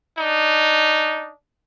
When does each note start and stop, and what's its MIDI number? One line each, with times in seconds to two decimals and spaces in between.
0.19 1.33 62
0.19 1.33 63